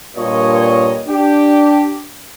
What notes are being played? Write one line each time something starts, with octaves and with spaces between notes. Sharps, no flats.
G2 A#2 C#5 D#5
D4 G4